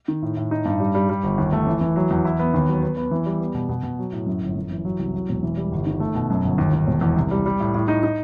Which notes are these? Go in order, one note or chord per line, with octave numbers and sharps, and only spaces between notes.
D#3
A2
A2
D#4
G2
G3
G3
G3
G1
D#2
A3
E3
E3
F#3
E2
E4
B3
D#2
F#3
B3
B3
E3
G3
B3
B2
B2
B2
F#3
A2
F#2
G1
F#2
E3
F#3
C2
F#3
E1
E3
G3
G1
D#3
A3
B2
F#2
G1
D#2
D#2
E1
E2
C2
G3
G3
A2
A2
D#4
D#4